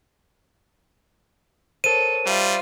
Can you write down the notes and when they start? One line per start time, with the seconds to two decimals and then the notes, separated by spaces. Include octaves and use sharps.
1.84 A4 A#4 C5 C#5 D#7
2.26 G3 F4 C5 E5